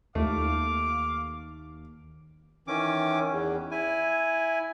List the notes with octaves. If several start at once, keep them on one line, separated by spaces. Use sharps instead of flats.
D#2 A3 F5 D6
D#3 E3 C#4 D6
E2
E4 G#5